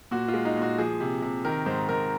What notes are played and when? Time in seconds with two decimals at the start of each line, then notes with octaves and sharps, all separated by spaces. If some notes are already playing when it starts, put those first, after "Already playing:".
0.11 A#2 F#4
0.28 F4
0.34 G#3
0.45 D#4
0.56 A#2
0.62 F#4
0.78 F3 G#4
1.00 C3
1.22 C3
1.45 D#3 A#4
1.66 G#2 C5
1.89 G#2 A#4